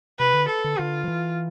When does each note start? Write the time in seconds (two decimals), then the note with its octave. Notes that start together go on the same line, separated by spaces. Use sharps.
0.19 C3 B4
0.34 D3
0.49 A4
0.64 D3
0.79 D3 F4
1.04 F3
1.08 E3